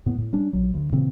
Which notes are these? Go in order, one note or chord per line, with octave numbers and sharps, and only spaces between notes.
A2 B3
A2
G3 C#4 D4
A#1 F#3
D2
A#2 C#3 E3 C4